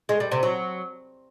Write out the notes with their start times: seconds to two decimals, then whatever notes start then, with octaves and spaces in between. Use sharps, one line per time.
0.09 G#3
0.20 G3
0.31 C3
0.43 F#3